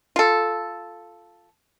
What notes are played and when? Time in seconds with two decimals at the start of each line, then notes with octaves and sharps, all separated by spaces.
0.16 F4 A4